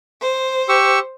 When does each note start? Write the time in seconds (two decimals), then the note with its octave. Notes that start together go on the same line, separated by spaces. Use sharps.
0.21 C5
0.69 G4 C#6 E6